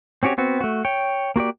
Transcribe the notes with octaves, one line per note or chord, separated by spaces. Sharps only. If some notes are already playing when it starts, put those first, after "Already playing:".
C4 C#4 F#4 G4 C#5
B3 C4 F#4
A3 F#4
C#5 G5
A#3 F#4 G4 D5